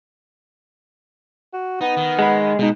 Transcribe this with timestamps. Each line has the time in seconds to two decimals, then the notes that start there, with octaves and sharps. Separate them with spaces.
1.53 F#4
1.81 B3 D#4
1.97 D#3
2.19 G#3 F#5 B5
2.59 B2 G#3 D#4